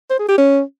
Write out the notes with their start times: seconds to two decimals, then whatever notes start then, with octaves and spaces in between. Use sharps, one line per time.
0.10 C5
0.19 G#4
0.28 G4
0.38 C#4